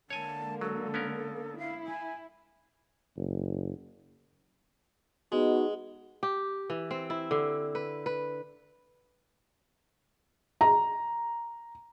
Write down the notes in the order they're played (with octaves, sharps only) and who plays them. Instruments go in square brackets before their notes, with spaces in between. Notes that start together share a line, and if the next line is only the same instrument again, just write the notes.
[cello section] D3 G#3 A#3 [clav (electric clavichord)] C#5 G#5 [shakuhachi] A5
[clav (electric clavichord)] F#3 [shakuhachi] A4
[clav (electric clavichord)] B3 C#4 A#4
[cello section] E4 [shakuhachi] F5
[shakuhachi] G#5
[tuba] F#1
[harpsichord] G#3 [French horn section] B3 D#4 F#4
[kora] G4
E3
C4
E4
D3
B4
B4
[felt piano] A#5